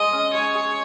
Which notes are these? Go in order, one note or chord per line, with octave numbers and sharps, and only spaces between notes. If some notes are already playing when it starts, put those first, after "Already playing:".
Already playing: G#3 D#5
C#4
G#3 C#5
G#4